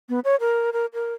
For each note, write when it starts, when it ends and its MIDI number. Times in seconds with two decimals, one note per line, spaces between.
0.09 0.20 59
0.24 0.36 73
0.40 0.70 70
0.73 0.86 70
0.94 1.14 70